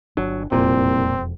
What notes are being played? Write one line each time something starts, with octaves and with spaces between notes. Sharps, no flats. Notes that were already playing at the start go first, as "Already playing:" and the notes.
G1 F#3 D4
E1 C2 F2 A#2 C4